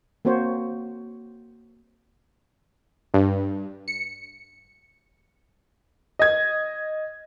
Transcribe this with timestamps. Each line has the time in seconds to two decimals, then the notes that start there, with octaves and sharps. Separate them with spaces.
0.25 A#3 C4 F#4 C5 C#5
3.14 G2
3.88 C#7
6.19 D#5 G#6